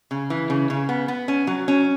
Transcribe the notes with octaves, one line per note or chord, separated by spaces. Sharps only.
C#3
E3
C#3
C#3
B3
B3
C#4
F#3
C#4